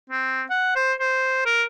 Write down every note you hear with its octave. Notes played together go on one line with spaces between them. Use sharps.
C4
F#5
C5
C5
A#4